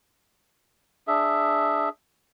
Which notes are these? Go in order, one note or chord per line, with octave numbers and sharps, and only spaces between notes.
D4 G#4 E5